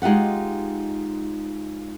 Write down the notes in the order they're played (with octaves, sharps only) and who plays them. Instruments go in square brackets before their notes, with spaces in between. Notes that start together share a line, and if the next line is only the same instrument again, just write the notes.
[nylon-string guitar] G#3 D#4 F4 G4 F#5